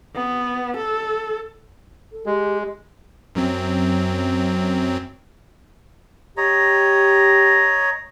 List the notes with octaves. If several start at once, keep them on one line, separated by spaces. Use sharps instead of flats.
B3
A4
A4
G#3 G4
F#2 F#3 C4
G4 C#5 D#5 A#5